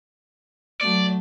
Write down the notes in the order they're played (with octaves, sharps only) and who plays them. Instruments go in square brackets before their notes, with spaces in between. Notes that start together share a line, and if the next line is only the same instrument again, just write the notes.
[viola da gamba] F#3 A3 [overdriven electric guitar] D5